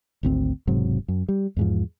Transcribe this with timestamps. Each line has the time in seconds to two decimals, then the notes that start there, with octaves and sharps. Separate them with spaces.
0.23 G#1 D2 C4
0.67 E1 G#2 C3 F#3
1.08 F#2
1.29 G3
1.57 E2 G#2 F3